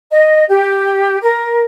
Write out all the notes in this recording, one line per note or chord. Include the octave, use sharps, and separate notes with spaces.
D#5
G4
A#4